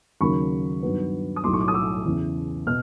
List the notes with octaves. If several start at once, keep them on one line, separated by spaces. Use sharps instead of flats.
D#2 C#3 F#3 A#3 B5 C#6
G2 D#3 F#3 B3
D#6
B1 A2 F#3 C6 D6
C#6
D6
D#6
D6 E6
E2 C#3 E3
B2 F6